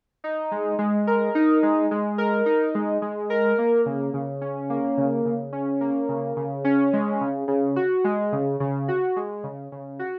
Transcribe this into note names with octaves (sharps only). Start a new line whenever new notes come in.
D#4
G#3
G#3
A#4
D#4
G#3
G#3
A#4
D#4
G#3
G#3
A#4
A#3
C#3
C#3
C#4
A#3
C#3
C#3
C#4
A#3
C#3
C#3
C#4
G#3
C#3
C#3
F#4
G#3
C#3
C#3
F#4
G#3
C#3
C#3
F#4